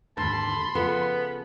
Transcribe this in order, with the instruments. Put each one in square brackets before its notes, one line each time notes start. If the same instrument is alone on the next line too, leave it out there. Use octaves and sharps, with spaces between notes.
[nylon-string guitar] D#2 G#2 D3 [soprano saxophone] A5 [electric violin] B5 C6
[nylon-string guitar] C#3 F3 A4 [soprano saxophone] B3